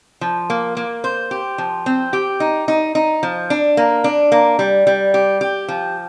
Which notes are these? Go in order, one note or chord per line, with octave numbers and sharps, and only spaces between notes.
F3
A#3
A#3
C5
G4
F3
C4
G4
D#4
D#4
D#4
F3
D4
A#3
D4
A#3
G3
G3
G4
G4
F3